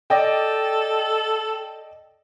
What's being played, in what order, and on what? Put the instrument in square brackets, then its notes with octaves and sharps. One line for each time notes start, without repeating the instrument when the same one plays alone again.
[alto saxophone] A4 [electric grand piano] D5 D#5 G5